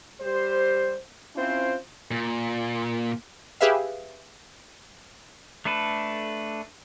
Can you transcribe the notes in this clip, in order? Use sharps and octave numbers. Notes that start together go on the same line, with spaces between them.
G3 G4 C5
C4 C#4 E4 F4 C5
A#2
G4 G#4 B4 E5 F5
A3 D4 A4 B4